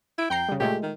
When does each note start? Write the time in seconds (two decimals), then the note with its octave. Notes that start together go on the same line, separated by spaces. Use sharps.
0.18 E4 D7
0.30 F2 G5 A#5 C7
0.49 C#3 G3
0.60 A#2 G#3 A3 G4
0.83 D#3